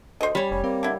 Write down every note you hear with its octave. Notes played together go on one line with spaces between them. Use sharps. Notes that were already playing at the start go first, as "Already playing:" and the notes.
D2 C5 D#5
G3 C#4 C#5 B5
F1 C#4
A#3 C4
D3 E4